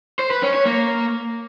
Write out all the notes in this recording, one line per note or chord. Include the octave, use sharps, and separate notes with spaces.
C5
B4
C#4
C#5
A#3